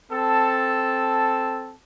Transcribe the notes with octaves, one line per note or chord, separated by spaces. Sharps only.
C4 A4 A5